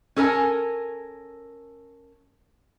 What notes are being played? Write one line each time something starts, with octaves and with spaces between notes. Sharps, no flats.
C#4 A4 A#4 G#5